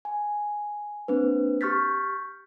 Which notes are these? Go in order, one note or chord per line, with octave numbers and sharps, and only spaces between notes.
G#5
A#3 C4 D4 B4
G4 C#6 F6 G6 A6 B6